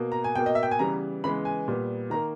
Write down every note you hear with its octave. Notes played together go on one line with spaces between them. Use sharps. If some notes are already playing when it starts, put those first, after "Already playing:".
Already playing: B2 A#3
A#5
G#5
B2 A#3 G5
D#5
E5
G5
G#5
C#3 E3 G3 B3 A#5
C#3 E3 G#3 B3 B5
G#5
A#2 G3 B3
D#3 A#3 A#5